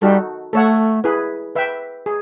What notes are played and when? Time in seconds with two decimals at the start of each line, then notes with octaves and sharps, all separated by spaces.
0.02 G3 D#4 F#4 A4
0.53 A3 A4 C#5 F#5
1.04 E4 G#4 B4
1.55 B4 E5 G5
2.06 G#4